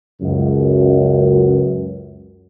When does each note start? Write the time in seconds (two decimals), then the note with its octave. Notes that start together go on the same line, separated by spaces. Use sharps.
0.22 C#2 F#2